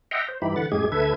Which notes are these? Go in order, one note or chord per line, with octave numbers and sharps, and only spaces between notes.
D#5 E5 F#5 G5 A#5 C6
C5
G2 E3 D#4 E4 G4 B5
D3 E3 F#5 B5 A6
F#2 A2 G#3 G4 G#4 G#6
D2 D3 A4 B4 E5 G#6